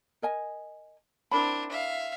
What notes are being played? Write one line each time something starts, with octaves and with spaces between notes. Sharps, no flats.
A#4 D#5 G#5
C4 D4 E4 A#4 B5
E5 F5